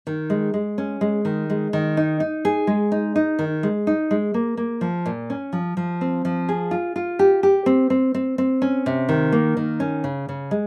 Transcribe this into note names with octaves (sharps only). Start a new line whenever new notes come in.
D#3
G#3
G#3
C#4
G#3
D#3
G#3
D#3
D#4
D#4
G#4
G#3
D#4
D#4
D#3
G#3
D#4
G#3
A#3
A#3
F3
A#2
C#4
F3
F3
C4
F3
G#4
F4
F4
G4
G4
C4
C4
C4
C4
C#4
C3
D#3
A#3
D#3
C#4
C#3
C#3
G#3